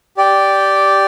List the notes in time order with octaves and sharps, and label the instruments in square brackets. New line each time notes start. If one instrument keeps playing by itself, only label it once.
[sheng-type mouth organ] G4 D5 G5